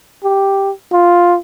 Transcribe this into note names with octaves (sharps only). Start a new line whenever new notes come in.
G4
F4